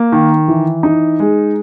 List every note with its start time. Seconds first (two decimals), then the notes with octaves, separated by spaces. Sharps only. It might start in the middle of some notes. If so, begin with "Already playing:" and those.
Already playing: A#3
0.12 D#3
0.48 E3
0.83 D#4
1.20 G#3